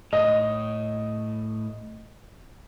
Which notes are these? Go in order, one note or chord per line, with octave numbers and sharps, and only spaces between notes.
A2 D#5